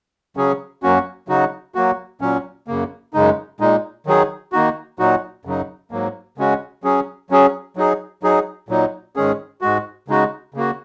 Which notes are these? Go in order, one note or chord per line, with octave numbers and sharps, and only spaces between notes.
C#3 F#3 C#4 G#4
F#2 F#3 A#3 C#4 F#4
C#3 F#3 D#4 F#4
F#3 A#3 F#4
A#2 F#3 C#4
F#2 C#3 A#3
F#2 C#3 G#3 D#4
A#2 G#3 D#4
D#3 F#3 D#4 G#4
D#3 A#3 D#4 F#4
A#2 F#3 D#4 F#4
F#2 C#3 F#3 D#4
G#2 F#3 A#3
C#3 G#3 C#4 F#4
F#3 C#4 G#4
F#3 C#4 G#4
F#3 D#4 G#4
F#3 D#4 G#4
A#2 F#3 D#4
G#2 D#3 G#3 C#4 G#4
G#2 G#3 F#4
C#3 G#3 D#4 F#4
C#3 A#3 F#4